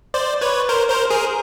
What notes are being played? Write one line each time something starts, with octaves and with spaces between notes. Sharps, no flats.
C5 D5
B4 C#5
A#4 C5
A#4 C5
G#4 A#4